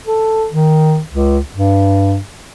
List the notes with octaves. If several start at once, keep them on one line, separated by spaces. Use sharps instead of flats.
A4
D#3
C#2
G2